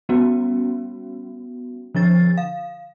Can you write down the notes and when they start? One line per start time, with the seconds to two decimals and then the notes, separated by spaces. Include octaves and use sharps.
0.09 G3 B3 C#4 F#4
1.95 D3 F3 D4 A6
2.38 F5